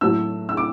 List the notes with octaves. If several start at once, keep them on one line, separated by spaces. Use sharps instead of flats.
A2 F#3 A3 E6
E6
D6